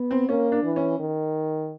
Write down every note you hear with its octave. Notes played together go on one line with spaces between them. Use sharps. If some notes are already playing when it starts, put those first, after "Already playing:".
Already playing: B3
C4
A#3 C#4
D4
E3
C#4
D#3